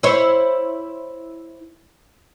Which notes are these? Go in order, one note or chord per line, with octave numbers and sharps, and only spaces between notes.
E4 C5 C#5